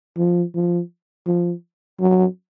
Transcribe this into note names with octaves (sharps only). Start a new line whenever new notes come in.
F3
F3
F3
F#3